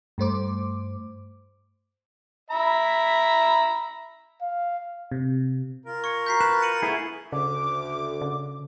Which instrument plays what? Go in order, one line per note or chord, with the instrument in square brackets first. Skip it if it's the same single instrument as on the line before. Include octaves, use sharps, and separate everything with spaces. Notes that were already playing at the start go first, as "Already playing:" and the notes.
[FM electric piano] G2 A3 C5 D6
[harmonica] E5 A#5 B5
[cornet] F5
[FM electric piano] C3
[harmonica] F4 A#4
[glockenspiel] C#6 [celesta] G#6 C#7
[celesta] F#4 A#5 C#6 [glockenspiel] G6 B6 C7
[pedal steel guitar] B4 [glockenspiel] E7
[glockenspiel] C#7 D#7 F#7
[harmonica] A3 B3 [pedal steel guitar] E4 G#4
[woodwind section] D2 D6 [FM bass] C#3
[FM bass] C#3